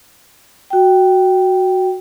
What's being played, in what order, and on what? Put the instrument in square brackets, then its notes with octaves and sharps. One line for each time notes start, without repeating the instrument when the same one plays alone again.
[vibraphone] F#4 G5